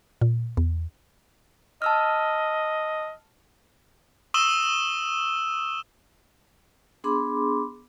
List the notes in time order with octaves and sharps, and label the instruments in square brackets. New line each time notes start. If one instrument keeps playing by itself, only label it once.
[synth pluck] A#2
E2
[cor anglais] D#5 [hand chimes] A5 E6 F6
[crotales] C#6 D#6 E6 E7 G7
[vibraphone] B3 D4 G#4 B5 C6 D6